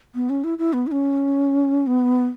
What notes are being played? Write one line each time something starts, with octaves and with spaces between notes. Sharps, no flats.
B3
C#4
E4
E4
B3
E4
C#4
B3